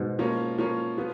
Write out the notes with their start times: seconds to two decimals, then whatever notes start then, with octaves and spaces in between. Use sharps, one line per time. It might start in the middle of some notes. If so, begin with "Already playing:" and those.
Already playing: G#2 B2
0.19 F3 A#3 C#4
0.59 F3 A#3 C#4
0.98 F3 B3